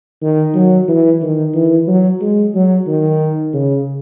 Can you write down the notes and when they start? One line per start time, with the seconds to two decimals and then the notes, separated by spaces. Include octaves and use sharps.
0.22 D#3
0.55 F#3
0.88 E3
1.22 D#3
1.55 E3
1.87 F#3
2.21 G#3
2.55 F#3
2.87 D#3
3.54 C#3